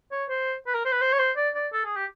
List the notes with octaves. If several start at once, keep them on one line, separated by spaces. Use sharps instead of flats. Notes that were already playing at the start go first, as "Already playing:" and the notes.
C#5
C5
B4
A#4
C5
B4
C5
C#5
C5
D5
D5
A4
G#4
G4